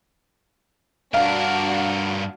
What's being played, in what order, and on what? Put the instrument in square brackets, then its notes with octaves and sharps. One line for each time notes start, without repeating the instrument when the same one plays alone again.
[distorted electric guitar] G2 A#4 [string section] D4 F#4 [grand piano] F5